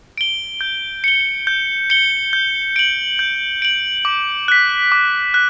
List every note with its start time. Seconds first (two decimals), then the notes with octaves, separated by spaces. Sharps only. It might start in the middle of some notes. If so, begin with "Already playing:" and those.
0.18 D7 G7
0.61 G6
1.04 C#7 G7
1.47 G6
1.90 C#7 G7
2.33 G6
2.76 D7 F#7
3.19 G6
3.62 D7 F#7
4.05 D6
4.48 F#6 B6
4.92 D6
5.34 F#6